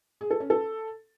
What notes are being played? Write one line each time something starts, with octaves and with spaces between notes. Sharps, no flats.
G#4
A4
C#4
A4